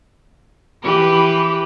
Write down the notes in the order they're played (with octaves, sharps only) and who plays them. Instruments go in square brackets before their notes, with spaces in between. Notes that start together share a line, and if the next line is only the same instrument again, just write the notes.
[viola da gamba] E3 G4 B4